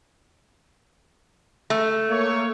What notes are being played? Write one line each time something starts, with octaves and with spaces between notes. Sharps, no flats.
A3
A#3 C#5